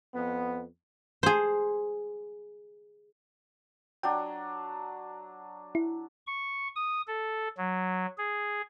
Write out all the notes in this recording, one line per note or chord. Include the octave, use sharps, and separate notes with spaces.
F2 B3
G#4 C5
F#3 D4 G5
E4
C#6
D#6
A4
F#3
G#4